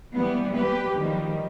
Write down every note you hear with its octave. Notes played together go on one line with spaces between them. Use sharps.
E3 G3 B3
G4 B4
D#3 F3 G3